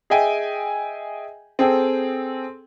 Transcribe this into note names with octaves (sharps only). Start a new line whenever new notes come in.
G#4 D#5 E5 G5 G#5
C4 G#4 A4 G5